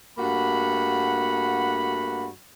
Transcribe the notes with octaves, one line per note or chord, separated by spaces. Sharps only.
G2 A3 A#3 F#4 F#5 B5